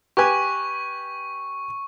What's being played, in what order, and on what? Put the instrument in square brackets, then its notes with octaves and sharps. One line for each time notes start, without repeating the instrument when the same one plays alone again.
[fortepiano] G4 B4 G#5 [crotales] C#6